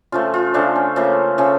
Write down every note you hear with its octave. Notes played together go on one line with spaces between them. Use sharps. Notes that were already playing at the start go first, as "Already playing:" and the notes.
C#3 F3 A3 F4
F4
C#3 F3 A3 D4
C#4
C#3 F3 A3 A#3
C#3 F3 A3 C#4